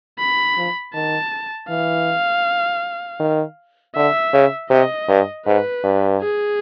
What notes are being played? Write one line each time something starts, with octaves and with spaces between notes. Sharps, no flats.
B5
F3
D#3 A5
E3 F5
D#3
D3 E5
C#3
C3 D#5
G2
G#2 B4
G2
G#4